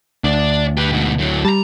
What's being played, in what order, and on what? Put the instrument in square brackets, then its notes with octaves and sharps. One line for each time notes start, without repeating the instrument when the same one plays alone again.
[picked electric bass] D2 [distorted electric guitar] D4 D5
[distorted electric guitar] G4 B4
G#2 B2
A2 F#3
[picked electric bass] G3 [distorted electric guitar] A5 A#5